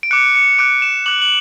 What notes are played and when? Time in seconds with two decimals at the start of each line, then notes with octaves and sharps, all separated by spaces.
0.03 D7
0.11 D6 F#6 C#7
0.35 C#7
0.59 D6 F#6 D7
0.82 E7
1.06 D6 F#6 F#7
1.22 F#7